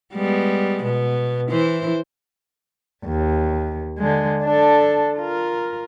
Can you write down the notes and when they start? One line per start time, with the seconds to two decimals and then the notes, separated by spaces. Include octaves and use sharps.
0.14 G3 G#3 B3
0.83 B2 B3
1.50 E3 E4 C5
3.05 D#2
3.98 D3 G#3
4.44 D4 A4
5.17 F4 A#4